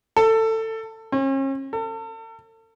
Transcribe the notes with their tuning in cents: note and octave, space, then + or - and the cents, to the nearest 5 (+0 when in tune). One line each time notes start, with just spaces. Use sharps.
A4 +20
C#4 -40
A4 +40